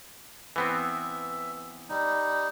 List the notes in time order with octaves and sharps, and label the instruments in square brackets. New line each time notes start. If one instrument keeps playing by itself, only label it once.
[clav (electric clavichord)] E3 B3 C4 [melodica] E5
[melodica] G3 D#4